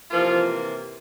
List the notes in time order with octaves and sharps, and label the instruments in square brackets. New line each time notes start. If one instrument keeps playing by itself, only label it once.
[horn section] C3 E3 F3 A#3 F4